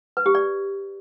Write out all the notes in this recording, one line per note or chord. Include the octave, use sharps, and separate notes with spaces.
B4
G4
D5